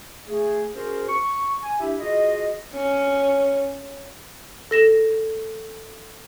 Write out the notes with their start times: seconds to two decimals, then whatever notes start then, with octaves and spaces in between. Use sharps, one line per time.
0.28 A3 G#4
0.75 C#4 F#4 G#4 A#4 C5
1.08 C#6
1.63 G#5
1.79 D4 E4 G4 E5
2.00 F4 F#4 G#4 D#5
2.74 C#4
4.71 A4 A#6 E7